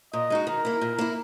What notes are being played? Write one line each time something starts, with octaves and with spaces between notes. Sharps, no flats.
A#2 D#5
G#3 D#4 F#4
D#3 A#4
A#3 E4
A#2
A#3 E4